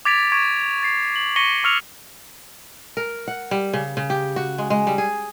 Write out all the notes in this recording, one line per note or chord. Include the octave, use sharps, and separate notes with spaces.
D6 G#6 A6 B6 D7 F7
C#6 G#6 D7
A6 C7
F#7
C#6 A#6 B6 C#7 D#7 G7
C#6 E6 F6 C#7 F7
A#4
F#5
G3
C#3
C#3
G4
F#4
G#3
G#3
G3
G#4